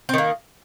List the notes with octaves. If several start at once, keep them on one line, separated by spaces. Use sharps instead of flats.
D#3 A#3 C4